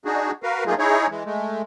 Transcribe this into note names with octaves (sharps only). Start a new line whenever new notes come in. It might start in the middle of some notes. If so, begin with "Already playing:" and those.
D4 D#4 F#4 G#4
F#4 A#4 B4 F5
F#3 A3 A#3 D#4 F4 G#4
D#4 E4 G#4 C#5
E3 G#3
G#3 A3